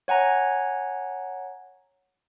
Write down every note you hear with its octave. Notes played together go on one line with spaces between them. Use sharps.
C#5 F#5 G#5 A#5